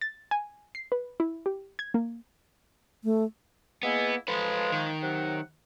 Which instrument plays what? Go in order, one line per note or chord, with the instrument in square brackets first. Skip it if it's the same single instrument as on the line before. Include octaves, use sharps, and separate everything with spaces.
[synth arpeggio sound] A6
G#5
C7
B4
E4
G4
G#6
A#3
[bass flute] A3
[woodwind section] G#3 A#3 E4 [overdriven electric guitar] B3
[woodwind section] F3 G#3 [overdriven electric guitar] A4 B4
[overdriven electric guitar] D#3
[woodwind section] C3 F#3 F#5